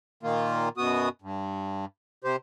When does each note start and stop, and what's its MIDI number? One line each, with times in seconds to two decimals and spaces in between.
0.23 0.69 46
0.23 0.69 51
0.23 0.69 58
0.23 0.69 65
0.78 1.09 42
0.78 1.09 47
0.78 1.09 59
0.78 1.09 66
0.78 1.09 87
1.22 1.85 43
2.24 2.36 48
2.24 2.36 67
2.24 2.36 72